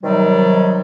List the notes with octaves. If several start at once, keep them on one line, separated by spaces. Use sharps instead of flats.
C3 D#3 F#3 G3